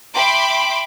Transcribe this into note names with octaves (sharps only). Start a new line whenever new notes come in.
E5 G5 B5 C6 D6